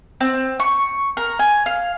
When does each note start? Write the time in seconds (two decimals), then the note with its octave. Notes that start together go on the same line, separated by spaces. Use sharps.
0.20 C4
0.60 C#6
1.17 A#4
1.39 G#5
1.66 F5